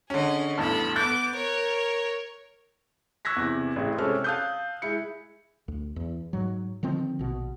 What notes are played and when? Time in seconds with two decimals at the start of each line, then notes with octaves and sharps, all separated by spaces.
0.10 D3 C#4 G#4 D#5
0.57 A1 E2 G2 A4 B5
0.96 B3 D6 F#6 G6 A6
1.35 A#4 C#5
3.25 C#6 E6 F#6 G#6 A#6 B6
3.36 E2 C3
3.76 A1 C#3 G#4
3.98 C3 G#3 C4 C#4 A4 F6
4.24 F5 A5 D#6 F#6 G6
4.82 G#3 E4 C#7
5.68 D2
5.96 E2
6.33 G#2 F#3
6.83 D3 D#3 F3 C4
7.19 A#1 B2